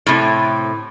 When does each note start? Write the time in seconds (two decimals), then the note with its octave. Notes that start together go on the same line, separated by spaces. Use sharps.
0.07 A2 C3